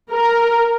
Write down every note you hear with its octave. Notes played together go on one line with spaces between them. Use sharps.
A#4